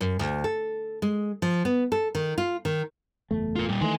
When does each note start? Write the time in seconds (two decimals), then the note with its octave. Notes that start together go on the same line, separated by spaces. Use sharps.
0.01 F#2
0.19 D2
0.44 A4
1.02 G#3
1.42 F3
1.65 B3
1.92 A4
2.15 D#3
2.38 F4
2.65 D#3
3.31 F#1 E2 A3
3.56 F4 A#4
3.69 A#2 G3
3.81 D#3 E3 A3 G#5 C6